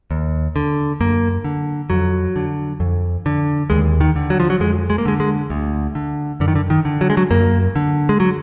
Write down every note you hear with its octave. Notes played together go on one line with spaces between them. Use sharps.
D#2
D3
F#2 A#3
D3
F2 F#3
D3
F2
D3
D#2 G#3
D#3
D3
F#3
F3
F#3
F2 G#3
G#3
A#3
D3 G#3
G#3
D2
D3
F#2 D3
D#3
D3
D#3
D3
F#3
G#3
F#3
F#2 A#3
D3
G#3
F#3